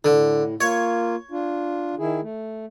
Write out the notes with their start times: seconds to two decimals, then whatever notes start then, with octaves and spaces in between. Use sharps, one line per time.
0.05 A2 D3
0.61 A#3 F4 C#5
1.31 D4 F4
1.98 D#3 E4 G#4
2.22 A3